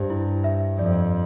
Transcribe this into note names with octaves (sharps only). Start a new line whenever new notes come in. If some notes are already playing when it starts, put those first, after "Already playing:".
Already playing: G2 G4 C5
E4
E5
F2 D5